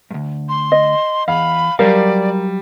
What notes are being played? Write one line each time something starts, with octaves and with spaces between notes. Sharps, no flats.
D2 G2
C6
D#5
E2 F5 B5
F#3 G3 A#4 C5 D5 F5